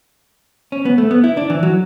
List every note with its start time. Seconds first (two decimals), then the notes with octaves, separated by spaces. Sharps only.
0.72 C#4
0.85 B3
0.98 A3
1.11 B3
1.24 E4
1.37 D4
1.50 E3
1.63 F#3